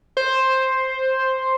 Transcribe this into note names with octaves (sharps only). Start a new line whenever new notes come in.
C5